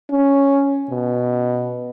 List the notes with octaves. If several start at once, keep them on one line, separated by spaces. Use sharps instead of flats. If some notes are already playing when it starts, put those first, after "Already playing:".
C#4
B2